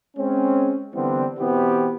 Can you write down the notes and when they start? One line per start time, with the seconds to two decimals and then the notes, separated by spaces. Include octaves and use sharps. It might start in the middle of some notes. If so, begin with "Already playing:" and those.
0.17 G#3 C4 C#4
0.94 D3 E3 G3 B3 C4
1.39 B2 E3 B3 C4 G4